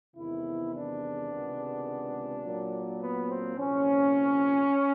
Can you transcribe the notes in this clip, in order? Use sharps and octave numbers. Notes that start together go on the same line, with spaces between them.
E2 C3 D#3 G#3 B3 E4
D4
C#2 C3 D#3 G#3 B3
A#2 F#3 A#3
B3
C4
C2 A#2 F3 C#4